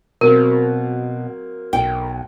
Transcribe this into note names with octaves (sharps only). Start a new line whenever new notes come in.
B2 F#3 A#3 C4 A#4
B1 G5